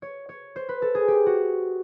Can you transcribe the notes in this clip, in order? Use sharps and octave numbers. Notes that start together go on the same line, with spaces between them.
C#5
C#5
C5
B4
A4
G#4
G4
F#4